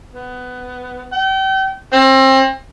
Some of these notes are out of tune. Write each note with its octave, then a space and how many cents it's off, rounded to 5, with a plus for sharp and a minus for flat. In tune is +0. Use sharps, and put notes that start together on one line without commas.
B3 +15
G5 -35
C4 +30